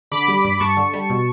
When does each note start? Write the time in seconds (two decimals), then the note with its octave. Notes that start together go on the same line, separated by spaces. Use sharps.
0.11 D3 B5 D6
0.28 G3
0.45 G2
0.60 G2 A5 C#6
0.77 D3
0.93 G3
1.10 B2